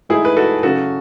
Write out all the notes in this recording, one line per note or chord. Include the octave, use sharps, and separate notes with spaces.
G#2 E3 A3 D#4 E4 G#4
B4
F#4 A4
C#3 F#3 C#4 F#4 A4